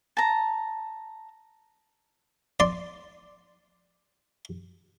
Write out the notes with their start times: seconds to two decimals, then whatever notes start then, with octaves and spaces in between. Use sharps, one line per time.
0.17 A5 A#5
2.60 D5 C6